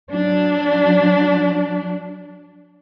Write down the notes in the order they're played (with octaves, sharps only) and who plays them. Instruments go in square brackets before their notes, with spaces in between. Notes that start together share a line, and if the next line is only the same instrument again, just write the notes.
[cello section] F#3 D4